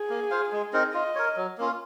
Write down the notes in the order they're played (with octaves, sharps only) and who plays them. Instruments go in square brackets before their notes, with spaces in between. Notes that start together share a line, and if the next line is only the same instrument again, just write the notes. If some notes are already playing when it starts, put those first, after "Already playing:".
Already playing: [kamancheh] G#4
[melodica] A#3
F4 C5 F5
G#3
C4 D#4 A#4
[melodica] F4 [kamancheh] D#5
[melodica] A#4 C#5
F#3
A#3 C#4 F4